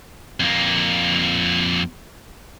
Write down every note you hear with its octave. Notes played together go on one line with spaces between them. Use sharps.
F2 A#3